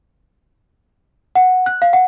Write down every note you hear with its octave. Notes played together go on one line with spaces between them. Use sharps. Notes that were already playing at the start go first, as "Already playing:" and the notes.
F#5
F#6
F5
F#5